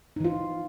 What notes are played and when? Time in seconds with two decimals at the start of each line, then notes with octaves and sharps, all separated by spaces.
0.16 D#4
0.20 E3
0.24 F4